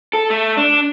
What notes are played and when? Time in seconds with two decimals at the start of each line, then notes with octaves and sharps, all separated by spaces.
0.13 A4
0.30 A3
0.57 D4